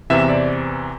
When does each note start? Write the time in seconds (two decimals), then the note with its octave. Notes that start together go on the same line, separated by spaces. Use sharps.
0.10 E2 C3 E3 E5
0.30 D5